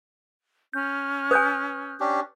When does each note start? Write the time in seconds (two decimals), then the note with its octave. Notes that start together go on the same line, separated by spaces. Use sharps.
0.73 C#4 F6 G6
1.31 B4 G#5 D#6 F#6 G6
2.00 C#4 D4 G4